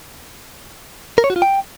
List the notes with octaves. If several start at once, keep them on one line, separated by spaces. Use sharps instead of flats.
A#4
C#5
F#4
F4
G5